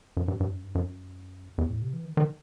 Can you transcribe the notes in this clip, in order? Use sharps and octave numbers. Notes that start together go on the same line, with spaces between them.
F#2
G2
G2
F#2
G2
F#2
E2
A2
C3
E3
D#3
D#3